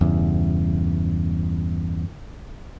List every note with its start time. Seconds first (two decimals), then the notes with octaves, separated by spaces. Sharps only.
0.01 E2 G2 C#3